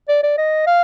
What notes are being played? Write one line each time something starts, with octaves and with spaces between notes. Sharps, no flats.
D5
D5
D#5
F5